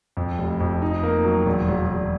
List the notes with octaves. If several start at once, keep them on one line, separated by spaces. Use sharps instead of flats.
F2
F1
F2
D#4
A#3
F#3
E1
E1
E1